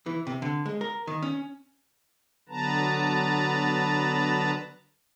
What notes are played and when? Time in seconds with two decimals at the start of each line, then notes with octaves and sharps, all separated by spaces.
0.06 E3
0.27 C3
0.42 D3
0.66 G#3
0.81 A#4
1.07 D#3
1.22 C#4
2.49 D3 F#3 B3 B4 A5 A#5